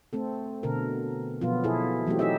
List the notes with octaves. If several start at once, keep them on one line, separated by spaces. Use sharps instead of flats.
A3 C4 A4
B2 D3 A4 A#4
B2 F3 F#3 B3 F4
B2 E4 G#4 A4
E3 F#3 A3 C4 G4
D#4 G4 G#4 D#5 E5